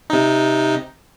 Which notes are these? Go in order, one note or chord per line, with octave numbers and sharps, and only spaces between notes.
C3 D#4